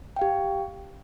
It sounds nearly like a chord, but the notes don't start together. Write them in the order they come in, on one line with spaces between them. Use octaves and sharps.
G5 F5 G4